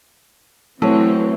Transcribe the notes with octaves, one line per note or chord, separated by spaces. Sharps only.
E3 F#3 A3 C4 E4 A4 C#5